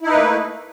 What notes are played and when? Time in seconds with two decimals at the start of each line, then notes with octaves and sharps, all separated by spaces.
0.01 E4
0.05 D#4
0.10 B4
0.15 A#3
0.19 A3